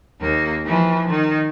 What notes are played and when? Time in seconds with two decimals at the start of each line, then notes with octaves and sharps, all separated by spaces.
0.21 D#2 A#3
0.65 E3 F3
1.10 D#3